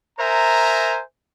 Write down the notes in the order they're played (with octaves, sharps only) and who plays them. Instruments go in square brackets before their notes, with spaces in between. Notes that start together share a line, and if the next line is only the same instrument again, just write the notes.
[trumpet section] A#4 C5 E5 G#5 A#5